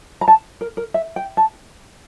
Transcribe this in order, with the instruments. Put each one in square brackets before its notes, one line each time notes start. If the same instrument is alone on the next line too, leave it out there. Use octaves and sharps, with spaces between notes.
[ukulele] A#5
A5
A#4
A#4
E5
G5
A5